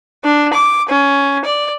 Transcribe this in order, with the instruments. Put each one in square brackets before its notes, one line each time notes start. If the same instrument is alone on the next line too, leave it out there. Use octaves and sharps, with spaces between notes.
[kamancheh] D4
D6
C#4
D5